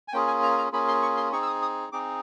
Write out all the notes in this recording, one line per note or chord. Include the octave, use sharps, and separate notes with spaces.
G#5
A#3 C#4 F4 G#4 G5
G#5
A#5
A#5
A#3 C#4 F4 G#4 B5
C6
C#6
C6
C4 D#4 G#4 C#6
E6
D#6
D#6
C4 D#4 G#4 D6